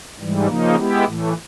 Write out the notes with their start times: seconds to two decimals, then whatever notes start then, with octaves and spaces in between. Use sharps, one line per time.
0.18 G#2 E3 G3
0.47 C#3 F3 A#3 D#4
0.76 G#3 B3 E4 G4
1.04 A2 E3 A3